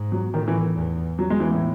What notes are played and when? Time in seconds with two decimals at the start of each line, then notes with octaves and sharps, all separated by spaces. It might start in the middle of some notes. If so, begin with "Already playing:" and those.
Already playing: G#2
0.12 F#3
0.33 A2 D#3
0.48 E3
0.76 E2
1.19 F#3
1.30 G#3
1.40 E3
1.51 A2